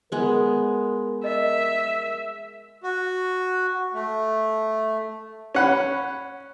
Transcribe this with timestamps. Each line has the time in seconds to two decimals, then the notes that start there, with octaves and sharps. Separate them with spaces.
0.12 G#3 B3 A#4
1.24 D#5 E5
2.84 F#4
3.94 A3
5.55 C#4 F#5 B5